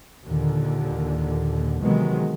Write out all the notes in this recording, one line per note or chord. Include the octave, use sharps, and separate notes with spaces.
D#2 A#2 D3
C3 D#3 E3 F#3 G#3 B3